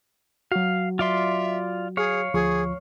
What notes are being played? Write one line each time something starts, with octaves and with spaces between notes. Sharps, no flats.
F#3 F#4 F5
F4 D5 E5 C6
G#4 C#5 F5
D2 F3 G#4 C#6